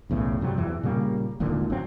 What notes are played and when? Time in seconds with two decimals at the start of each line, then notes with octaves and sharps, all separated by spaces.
0.10 B1 E2 A2 C#3
0.41 G2 C3 F#3 G3
0.58 E2 E3
0.83 A#2 C#3 G3 A#3
1.40 D#1 G#1 A#2 D3
1.70 G#1 F#3 C4